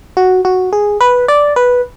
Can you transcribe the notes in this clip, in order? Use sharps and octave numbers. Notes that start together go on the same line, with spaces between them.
F#4
F#4
G#4
B4
D5
B4